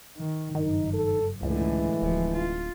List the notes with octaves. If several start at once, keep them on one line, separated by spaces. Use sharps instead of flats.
D#3
F#1 G2 D#3 D#4
A4
C#2 A2 D3 E3 G#3
D1 F3
F4